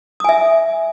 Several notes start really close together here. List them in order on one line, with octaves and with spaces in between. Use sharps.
D#6 G#5 E5